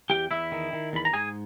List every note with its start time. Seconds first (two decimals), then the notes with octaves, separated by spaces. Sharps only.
0.10 E2 G4 G5
0.31 E2 E4 E5
0.52 D#3
0.73 D#3
0.93 E2 B5
1.05 A#5
1.13 G#2 G#4 G#5